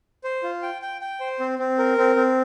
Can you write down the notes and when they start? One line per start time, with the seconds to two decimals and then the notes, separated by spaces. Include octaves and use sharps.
0.24 C5
0.43 F4
0.63 G5
0.82 G5
1.01 G5
1.20 C5
1.40 C4
1.59 C4
1.78 A#4
1.98 C4
2.16 C4